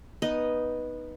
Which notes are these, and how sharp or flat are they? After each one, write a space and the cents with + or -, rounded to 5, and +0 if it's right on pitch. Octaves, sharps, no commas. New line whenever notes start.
B3 -10 D#4 +0 D#5 +0